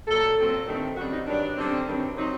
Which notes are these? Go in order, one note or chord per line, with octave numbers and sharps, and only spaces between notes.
A#2 F#3 A3 A4
A#2 F#3 C4
G2 D#3 A3 C4
F#2 D#3 G3 C4 F#4
D#4
G2 D#3 F#3 D4
F#2 D3 G3 C4
G2 D#3 F#3 C4
C3 F#3 C4 D#4